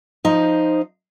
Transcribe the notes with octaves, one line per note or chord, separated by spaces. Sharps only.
F3 D#4 C5